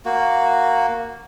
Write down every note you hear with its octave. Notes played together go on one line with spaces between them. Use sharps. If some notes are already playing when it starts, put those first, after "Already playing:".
A#3 F#4